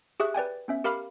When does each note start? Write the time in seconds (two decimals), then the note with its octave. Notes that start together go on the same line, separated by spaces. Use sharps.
0.20 G4 G#4 E5 C#6 F#6
0.34 B4 D5 G5 G#5
0.68 B3 C#4 E5
0.84 G4 A#4 F5 B5 D6 F6